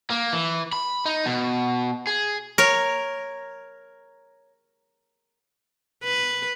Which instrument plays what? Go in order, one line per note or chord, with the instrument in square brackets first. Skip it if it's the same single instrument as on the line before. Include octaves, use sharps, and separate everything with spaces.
[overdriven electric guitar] A#3
E3
B5
D#4
B2
G#4
[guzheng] A#4 C#5
[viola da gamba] B4